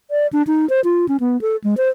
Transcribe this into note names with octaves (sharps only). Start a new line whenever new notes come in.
D5
D4
D#4
C5
F4
C#4
B3
A4
G#3
C5